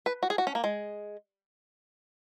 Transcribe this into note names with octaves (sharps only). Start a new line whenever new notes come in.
B4
F#4
G#4
F#4
C#4
A#3
G#3